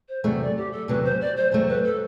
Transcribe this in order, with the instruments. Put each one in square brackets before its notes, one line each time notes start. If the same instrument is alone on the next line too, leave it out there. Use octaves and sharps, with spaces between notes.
[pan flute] C5
[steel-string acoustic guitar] E2 C3 F#3 A3 [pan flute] D5
[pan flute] D5
G4
A4
[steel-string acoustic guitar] E2 C3 F#3 A3 [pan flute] B4
[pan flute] C5
D5
C5
[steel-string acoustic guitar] E2 C3 F#3 A3 [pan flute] C5
[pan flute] B4
A4